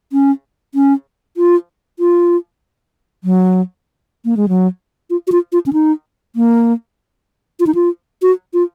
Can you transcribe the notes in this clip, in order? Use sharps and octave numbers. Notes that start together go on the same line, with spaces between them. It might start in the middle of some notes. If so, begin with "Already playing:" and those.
C#4
C#4
F4
F4
F#3
A#3
G#3
F#3
F4
F#4
F4
F4
C#4
D#4
A#3
F4
D#4
F4
F#4
F4